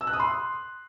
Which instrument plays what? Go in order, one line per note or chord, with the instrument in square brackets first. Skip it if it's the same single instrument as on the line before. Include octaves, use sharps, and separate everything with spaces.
[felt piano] E6
F#6
D#6
C6